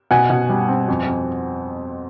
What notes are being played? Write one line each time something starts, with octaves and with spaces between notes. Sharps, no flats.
B2 F#5 G#5
B2
G3
C4
F2
F2